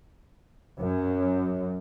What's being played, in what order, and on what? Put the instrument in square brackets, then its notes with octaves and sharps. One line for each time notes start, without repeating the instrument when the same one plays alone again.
[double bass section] F#2